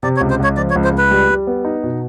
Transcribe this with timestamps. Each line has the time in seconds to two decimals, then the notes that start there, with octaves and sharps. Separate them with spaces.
0.03 C3 D5
0.16 C#5
0.21 C#2
0.30 C5
0.40 C#2 C#5
0.57 F3 D5
0.70 C#5
0.76 C#2
0.84 C5
0.93 C#2 B4
1.11 G3
1.29 G3
1.47 B3
1.65 D#4
1.83 B2